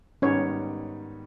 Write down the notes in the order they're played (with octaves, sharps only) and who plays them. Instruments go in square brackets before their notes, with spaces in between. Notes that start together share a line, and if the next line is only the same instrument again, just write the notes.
[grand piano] G#2 D#3 G3 B3 D#4 [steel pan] C#4 C#5